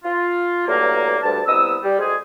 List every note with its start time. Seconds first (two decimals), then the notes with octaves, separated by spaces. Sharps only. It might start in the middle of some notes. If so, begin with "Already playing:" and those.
0.04 F4
0.67 E2 G2 F#3 A3 A#3
1.23 D2 G2 A5
1.46 C2 B3 D#6 E6
1.83 G3
1.99 D2 G#3 G#4